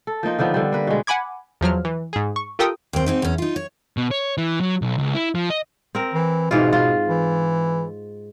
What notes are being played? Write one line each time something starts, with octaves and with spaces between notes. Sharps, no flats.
A4
F3 A#3 D#4 F4
D3 D#3 F3 B3
D3 G3
A#3 B4
B2 G#3
F#5 G#5 B5 D6 G#6
E2 F3 F#3 F6
E3
G#2 G#4
C#6
F4 G4 A4 A#4 G5 D#6
D#2 C4
G#2 C4 D#4
E2 C#4
D#4 F4
C#5
B2
C#5
E3
F#3
B1
C#2
E4
F3
D#5
C4 A#4
E3
G#2 B2 E3 F4
F4
E3